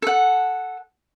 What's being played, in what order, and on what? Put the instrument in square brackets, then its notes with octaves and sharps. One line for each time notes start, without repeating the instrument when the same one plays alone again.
[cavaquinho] A4 F#5